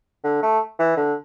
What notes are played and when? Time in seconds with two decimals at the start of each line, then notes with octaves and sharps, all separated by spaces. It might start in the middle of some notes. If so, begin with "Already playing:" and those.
0.24 D3
0.42 A3
0.79 E3
0.97 D3